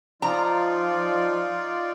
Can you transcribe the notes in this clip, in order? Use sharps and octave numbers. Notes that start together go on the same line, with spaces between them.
F3 D#4 F4 D5 A#5